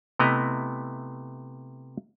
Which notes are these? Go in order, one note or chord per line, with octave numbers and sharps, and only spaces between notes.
C3 A3 B3 E4 D#5 A#5